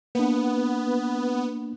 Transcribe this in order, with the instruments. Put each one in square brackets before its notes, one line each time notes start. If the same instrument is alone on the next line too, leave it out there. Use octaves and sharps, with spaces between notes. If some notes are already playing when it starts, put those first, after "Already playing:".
[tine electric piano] A#3 D4 [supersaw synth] B3